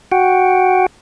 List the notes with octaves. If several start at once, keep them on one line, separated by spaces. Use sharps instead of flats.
F#4 F#5 G5